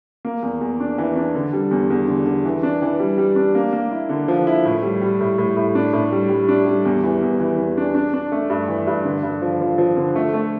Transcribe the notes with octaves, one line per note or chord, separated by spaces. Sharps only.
A#3
E2
E2
D4
E3
D4
D3
G3
E2
E2
D3
D3
E3
D4
E3
G3
G3
D4
A#3
A#3
E4
D3
F3
E4
A2
G3
G3
A2
A2
A2
D4
A2
G3
G3
D4
G3
E2
E3
E2
E3
E2
D4
D4
D4
A3
G2
E3
G2
D3
G2
F3
F3
F3
D3
A3
A3